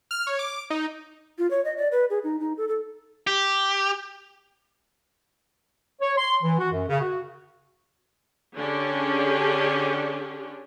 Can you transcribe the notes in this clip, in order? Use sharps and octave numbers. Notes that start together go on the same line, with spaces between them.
F6
C#5
D6
D#4
F4
C#5
D#5
D5
B4
G#4
D#4
D#4
A4
A4
G4
C#5
C6
E3
F#4
F#2
C#3
F#4
D3 C#4 D4 G4 G#4